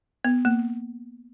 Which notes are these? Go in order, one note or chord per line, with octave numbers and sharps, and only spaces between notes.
B3
A#3